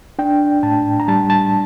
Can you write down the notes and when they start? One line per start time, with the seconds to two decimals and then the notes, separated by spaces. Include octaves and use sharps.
0.19 D4 G5
0.63 A2 A5
1.00 A#5
1.08 G3 A5
1.30 A5